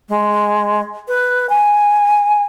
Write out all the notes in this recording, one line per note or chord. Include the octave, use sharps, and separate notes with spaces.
G#3
B4
G#5